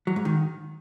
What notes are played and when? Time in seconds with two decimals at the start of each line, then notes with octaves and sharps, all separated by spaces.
0.07 F#3
0.16 G#2
0.25 D#3